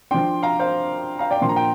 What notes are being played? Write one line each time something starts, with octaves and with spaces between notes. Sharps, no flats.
F3 D4 G5 C6
F5 A#5
C5 F5
F5 A#5
D5 G5
A#2 F3 D4 C6
A#5
G5